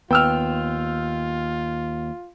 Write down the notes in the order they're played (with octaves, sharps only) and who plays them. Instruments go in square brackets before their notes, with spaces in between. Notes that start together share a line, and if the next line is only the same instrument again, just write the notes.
[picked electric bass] D#2 [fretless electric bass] B3 [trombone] F4 [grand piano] G5 E6 F6